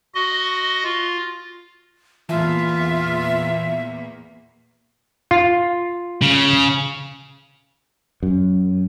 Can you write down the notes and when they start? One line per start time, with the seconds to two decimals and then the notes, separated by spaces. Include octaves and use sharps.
0.15 F#4 D#5
0.84 F4
2.29 E2 A#2 E3 A#3 F4 E5 G#5 A5
5.31 F4
6.22 C#3
8.23 F#2